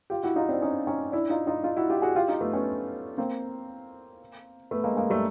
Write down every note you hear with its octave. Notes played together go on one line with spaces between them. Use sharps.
F4 G4
E4 F#4
D#4 F4
C4 D4
C#4 D#4
C#4 D#4
D4 E4
D#4 F4
D#4 F4
D#4 F4
E4 F#4
F4 G4
F#4 G#4
F4 G4
D#4 F4
A3 B3
B3 C#4
A#3 C4
A3 B3
G#3 A#3
G#3 A#3
G3 A3